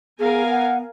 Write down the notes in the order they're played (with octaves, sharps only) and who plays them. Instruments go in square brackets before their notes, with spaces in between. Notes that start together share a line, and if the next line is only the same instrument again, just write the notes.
[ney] B3 [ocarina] G#4 [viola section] A#4 F5 G#5
[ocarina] F#5